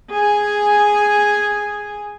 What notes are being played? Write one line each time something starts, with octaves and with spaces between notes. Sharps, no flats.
G#4 G#5